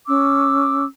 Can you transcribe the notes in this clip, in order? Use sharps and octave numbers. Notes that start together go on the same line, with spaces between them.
C#4 D6 E6